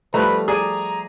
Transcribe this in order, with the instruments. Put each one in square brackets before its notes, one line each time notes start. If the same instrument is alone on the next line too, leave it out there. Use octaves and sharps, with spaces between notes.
[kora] F3 G3 A3 [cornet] B4 [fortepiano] A#5
[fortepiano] G#4 D5 [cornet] A#5